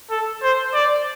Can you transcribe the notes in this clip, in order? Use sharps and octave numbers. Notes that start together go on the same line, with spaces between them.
A4
C5
D5